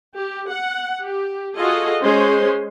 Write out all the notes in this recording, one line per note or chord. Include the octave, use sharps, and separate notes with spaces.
G4
F#5
G4
F4 F#4 G#4 A4 D#5
G#3 C#4 C5 C6